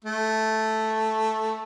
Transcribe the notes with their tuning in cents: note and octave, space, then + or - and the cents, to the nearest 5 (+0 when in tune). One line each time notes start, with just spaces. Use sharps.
A3 -5